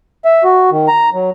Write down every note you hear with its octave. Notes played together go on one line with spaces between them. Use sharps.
E5
F#4
D#3
A#5
F#3